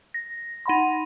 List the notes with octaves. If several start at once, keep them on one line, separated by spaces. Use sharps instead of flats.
A#6
D#4 F#5 B5 C6